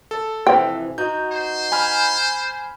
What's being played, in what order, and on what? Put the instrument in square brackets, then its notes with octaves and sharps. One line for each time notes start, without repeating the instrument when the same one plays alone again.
[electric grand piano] A4
[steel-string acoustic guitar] F2 C3 E3 [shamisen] G5
[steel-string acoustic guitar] D#4 F#4 [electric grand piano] G6
[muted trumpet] C5
[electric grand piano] G#5 B5 F6